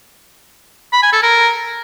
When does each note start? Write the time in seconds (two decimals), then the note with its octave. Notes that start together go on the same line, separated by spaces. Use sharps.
0.93 B5
1.03 G#5
1.13 A4
1.23 A#4